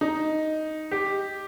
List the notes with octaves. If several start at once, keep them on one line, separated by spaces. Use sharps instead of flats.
D#4
G4